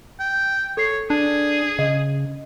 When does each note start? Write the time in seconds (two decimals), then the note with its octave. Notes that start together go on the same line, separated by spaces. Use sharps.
0.20 G5
0.77 A4 C#5 C7
1.10 D4 G#4
1.79 C#3 D#5